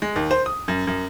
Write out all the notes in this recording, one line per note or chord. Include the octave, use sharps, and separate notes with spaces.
G#3
D#2
C5
D#6
F#2
F#2